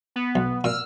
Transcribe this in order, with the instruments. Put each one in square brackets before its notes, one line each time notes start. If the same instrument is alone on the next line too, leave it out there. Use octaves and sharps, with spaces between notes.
[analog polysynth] B3
[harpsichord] B1
[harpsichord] A#2 [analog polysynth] E6 F6